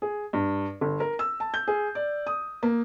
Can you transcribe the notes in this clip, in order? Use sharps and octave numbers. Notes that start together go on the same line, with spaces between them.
G#4
G2
G1
A#4
E6
A5
G6
G#4
D5
D#6
A#3